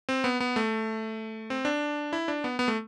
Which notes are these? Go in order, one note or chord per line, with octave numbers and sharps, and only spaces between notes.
C4
B3
B3
A3
C4
D4
E4
D4
B3
B3
A3